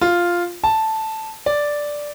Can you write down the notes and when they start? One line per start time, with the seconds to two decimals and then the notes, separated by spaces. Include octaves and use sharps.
0.01 F4
0.64 A5
1.46 D5